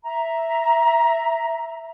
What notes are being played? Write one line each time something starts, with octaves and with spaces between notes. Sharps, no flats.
E5 A#5